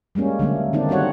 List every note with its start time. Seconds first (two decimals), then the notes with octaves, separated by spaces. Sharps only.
0.15 G3 G#3 A#3 C#4
0.39 D3 F#3 A3 A#3
0.73 D3 D#3 A#3 C4 D4 D#4
0.89 G3 C4 F#4 C#5 F#5